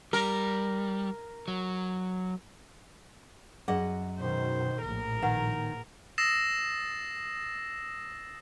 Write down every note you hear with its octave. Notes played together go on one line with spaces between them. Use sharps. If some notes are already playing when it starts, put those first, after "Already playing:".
G3 A#4
F#3
F#2 G#4 D5 D#5 F#5
B2 D#3 C5
A#1 A2 A#4
D#3 B4 F#5
D#6 E6 A6 A#6 C7 E7